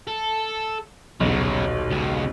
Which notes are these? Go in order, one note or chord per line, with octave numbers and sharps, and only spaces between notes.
A4
D#1 B1 C#3 F#3
C#2 C#3